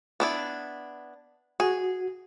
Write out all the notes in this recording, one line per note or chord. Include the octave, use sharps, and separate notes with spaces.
B3 D4 E4
F#4 G#4